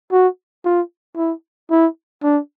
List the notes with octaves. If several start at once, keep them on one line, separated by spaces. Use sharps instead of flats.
F#4
F4
E4
E4
D4